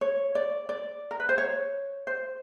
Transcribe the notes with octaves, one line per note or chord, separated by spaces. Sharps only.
C#5
D5
D5
A#4
B4
C5
C#5
C5